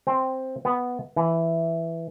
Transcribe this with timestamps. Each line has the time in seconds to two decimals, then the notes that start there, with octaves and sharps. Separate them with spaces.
0.07 C4
0.65 B3
1.16 E3